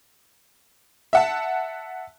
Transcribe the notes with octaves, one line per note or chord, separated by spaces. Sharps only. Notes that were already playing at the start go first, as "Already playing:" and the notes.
E5 F#5 A5